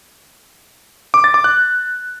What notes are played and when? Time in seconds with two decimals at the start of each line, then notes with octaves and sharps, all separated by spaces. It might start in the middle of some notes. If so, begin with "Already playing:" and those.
1.14 D6
1.24 A6
1.34 D6
1.44 F#6